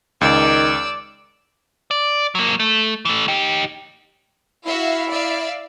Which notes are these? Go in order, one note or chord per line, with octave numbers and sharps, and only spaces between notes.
C#2 D#3 D5 E6
D5
F#3 A#3
A3
E3 A3
D#4 G4
E4 F#4 E5 F5
D5 E5 F5